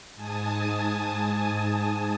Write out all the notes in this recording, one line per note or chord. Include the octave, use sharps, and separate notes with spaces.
G#2 G#5 A5 D#6